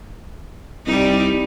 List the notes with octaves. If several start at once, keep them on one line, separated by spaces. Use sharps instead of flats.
C2 G3 D#4